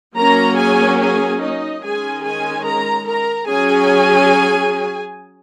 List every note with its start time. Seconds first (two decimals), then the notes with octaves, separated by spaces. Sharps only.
0.17 F#3 A#3 C#4 A#4 A#5
0.58 G#4 G#5
0.99 G#4 G#5
1.41 D#4 D#5
1.83 D#3 G#3 C#4 G#4 G#5
2.24 G#4 G#5
2.65 A#4 A#5
3.07 A#4 A#5
3.48 F#3 C#4 G#4 G#5